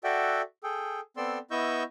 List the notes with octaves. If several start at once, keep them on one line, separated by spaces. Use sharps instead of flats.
F#4 A4 D5 E5 F#5 G5
G#4 A4 G5
B3 C4 A4 D5 C6 E6
B3 E4 D#5 C#6 E6 G6